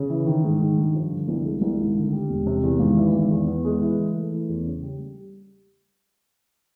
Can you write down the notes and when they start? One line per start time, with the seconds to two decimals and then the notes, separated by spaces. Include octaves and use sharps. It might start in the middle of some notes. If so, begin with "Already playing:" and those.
Already playing: C#3
0.10 E3
0.27 D#3
0.44 G#2
0.61 D#3
0.77 G2
0.95 F3
1.11 D3
1.28 C2
1.44 G#3
1.62 C2
1.79 G#1
1.95 D3
2.13 G3
2.30 E1
2.47 C3
2.63 E2
2.79 G#1
2.97 E3
3.13 G#1
3.31 E2
3.47 B3
3.65 G#3
3.81 E3
3.97 E3
4.14 A3
4.31 E3
4.49 E2
4.66 C#3
4.83 G3
4.99 G3